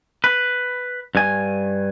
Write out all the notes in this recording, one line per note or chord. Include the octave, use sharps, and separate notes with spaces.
B4
G2 G#5